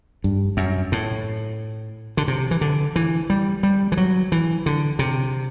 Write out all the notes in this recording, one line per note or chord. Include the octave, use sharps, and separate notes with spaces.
G2
F#2
A2
D3
C3
E3
D3
E3
G3
G3
E3
F#3
E3
D3
C3